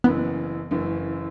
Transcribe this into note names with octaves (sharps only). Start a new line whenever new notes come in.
F#1 F#2 C#3 E3 B3
F#1 F#2 C#3 E3